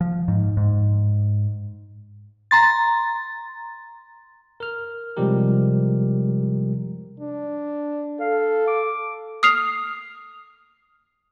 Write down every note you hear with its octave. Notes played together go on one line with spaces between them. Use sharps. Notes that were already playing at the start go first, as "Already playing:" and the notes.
F3
G#2
G#2
A#5 C6 A6
A#4 F6
C3 F3 G3 G#3 G4 A#4
D4
A4 F5
D6
D#6 F6 C7 F7